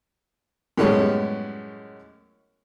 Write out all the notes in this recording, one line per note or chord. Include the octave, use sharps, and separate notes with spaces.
F#2 A2 G3 G#3 B3 C#4